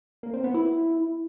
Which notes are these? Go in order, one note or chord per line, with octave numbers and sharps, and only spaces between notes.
A#3
C4
B3
E4